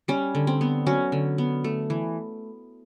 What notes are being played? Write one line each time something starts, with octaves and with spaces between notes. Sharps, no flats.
G3 C#4
D3
C4
B3
F#3 C#4
D3
B3
A3
E3